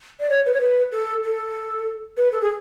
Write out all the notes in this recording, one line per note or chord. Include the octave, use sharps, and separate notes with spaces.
D5
C#5
B4
C#5
B4
A4
A4
B4
A4
G#4